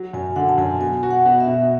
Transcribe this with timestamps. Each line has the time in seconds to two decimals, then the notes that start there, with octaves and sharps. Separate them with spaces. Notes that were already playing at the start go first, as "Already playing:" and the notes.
Already playing: F#3
0.13 F#2 G#5
0.36 D3 F#5
0.49 A5
0.58 F#2 G#5
0.80 B2 G#5
1.03 F#4
1.11 F#5
1.25 B2
1.40 E5
1.47 B2